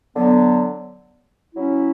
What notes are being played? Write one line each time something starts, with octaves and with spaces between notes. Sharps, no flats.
D3 F#3 B3
F#3 C#4 E4